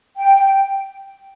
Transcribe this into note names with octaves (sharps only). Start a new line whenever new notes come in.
G5